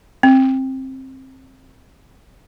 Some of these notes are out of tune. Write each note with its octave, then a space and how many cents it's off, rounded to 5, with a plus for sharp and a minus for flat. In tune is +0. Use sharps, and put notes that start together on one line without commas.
C4 +20